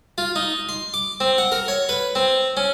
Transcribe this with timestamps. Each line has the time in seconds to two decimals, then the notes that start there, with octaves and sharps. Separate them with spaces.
0.18 F4
0.36 D#4
0.69 C6
0.94 D6
1.20 C4
1.38 F#5
1.52 A#4
1.68 C#5
1.89 B4
2.15 C4
2.57 C#4